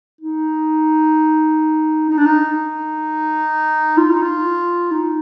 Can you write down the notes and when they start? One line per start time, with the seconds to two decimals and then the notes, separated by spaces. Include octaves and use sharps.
0.21 D#4
2.10 D#4
2.18 D4
2.26 D#4
3.97 F4
4.10 D#4
4.22 F4
4.91 D#4